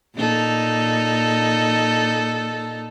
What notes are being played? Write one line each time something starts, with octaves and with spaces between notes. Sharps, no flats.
A#2 D#4 A4